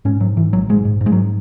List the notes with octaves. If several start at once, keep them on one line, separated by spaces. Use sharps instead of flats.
G#2 C#4
G#2 F#3
G#2 E3
G#1 F#3
G#2 G#3
G#2
G#2
G#3
F#3